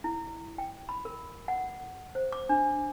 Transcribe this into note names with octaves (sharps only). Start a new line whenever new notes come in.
E4
G5
B5
A#4
F#5
C5
D6
D4